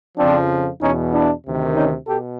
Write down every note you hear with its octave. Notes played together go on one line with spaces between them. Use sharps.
F2 C#3 F3 C4 D4
E2 B2 C#4 D#4
D4 E4
D2 C3 D#3
C#4 D#4
B2 G4 A4